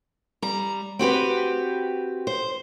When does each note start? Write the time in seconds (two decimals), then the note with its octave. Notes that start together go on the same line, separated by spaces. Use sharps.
0.42 G3 A#5
0.99 C4 F#4 G4 B4
2.27 C5